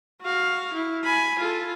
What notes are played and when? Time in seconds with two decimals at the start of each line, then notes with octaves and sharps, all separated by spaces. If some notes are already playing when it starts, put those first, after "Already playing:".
0.22 F#4 F5
0.74 E4
1.04 G#5 B5
1.39 F4 A4